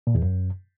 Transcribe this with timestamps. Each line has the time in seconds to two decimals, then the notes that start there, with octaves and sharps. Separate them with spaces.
0.07 A#2
0.15 E2
0.22 F#2